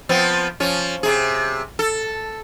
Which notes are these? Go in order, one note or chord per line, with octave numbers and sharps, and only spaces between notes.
F3 B3 C4
F3 C#4
C3 G#4
A4